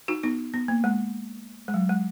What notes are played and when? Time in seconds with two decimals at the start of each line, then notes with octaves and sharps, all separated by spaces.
0.08 D#4 F#4
0.23 B3 D#4
0.54 B3
0.68 A#3
0.84 G#3
1.68 G#3
1.74 F#3
1.89 G#3